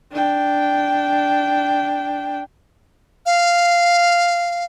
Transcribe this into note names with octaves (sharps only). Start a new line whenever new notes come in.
D4 G5
F5